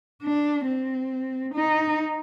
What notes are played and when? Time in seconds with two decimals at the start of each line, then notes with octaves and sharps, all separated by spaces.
0.23 D4
0.67 C4
1.55 D#4